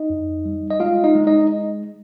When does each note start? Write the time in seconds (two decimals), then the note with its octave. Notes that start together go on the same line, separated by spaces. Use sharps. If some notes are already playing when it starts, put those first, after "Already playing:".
Already playing: D#4 D#5
0.10 F2
0.45 G3
0.71 D#5
0.80 G#3 F4 F5
1.04 D#4 D#5
1.15 G#3
1.27 D#4 D#5